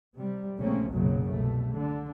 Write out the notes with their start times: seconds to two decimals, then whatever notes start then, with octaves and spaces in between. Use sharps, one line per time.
0.14 C3 G3
0.58 A#1 C#3 A3 A#3 C4 C#4
0.89 F#1 B1 F#2 A#2 C#3 F#3
1.28 C2 B2 A3
1.72 D3